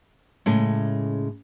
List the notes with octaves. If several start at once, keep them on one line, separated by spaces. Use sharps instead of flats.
A2 C#3 G#3